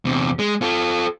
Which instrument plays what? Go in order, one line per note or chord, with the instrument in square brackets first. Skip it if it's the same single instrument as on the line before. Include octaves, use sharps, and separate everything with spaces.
[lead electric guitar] E2 C3
G#3
F4 A4